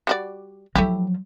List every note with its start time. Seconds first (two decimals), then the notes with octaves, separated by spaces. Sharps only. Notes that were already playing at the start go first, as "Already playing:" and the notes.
0.07 G3 F#4 D5
0.76 F3 F#3 A3 E4 G4